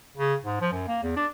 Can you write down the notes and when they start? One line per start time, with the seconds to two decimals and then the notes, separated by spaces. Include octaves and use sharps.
0.17 C#3
0.45 G#2
0.61 F3
0.72 F#2
0.88 A#3
1.03 E2
1.16 D4